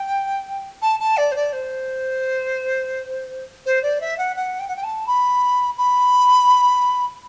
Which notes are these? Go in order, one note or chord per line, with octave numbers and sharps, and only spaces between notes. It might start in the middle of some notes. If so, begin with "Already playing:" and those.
Already playing: G5
A5
A5
D5
C5
D5
C5
C5
D5
E5
F#5
F#5
G5
F#5
G5
A5
B5
B5